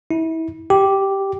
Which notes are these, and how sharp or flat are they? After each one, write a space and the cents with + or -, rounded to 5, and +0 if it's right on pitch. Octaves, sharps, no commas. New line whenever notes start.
E4 -30
G4 -5